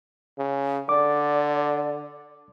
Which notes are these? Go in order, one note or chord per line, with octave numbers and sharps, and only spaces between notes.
C#3
D3 D5 D6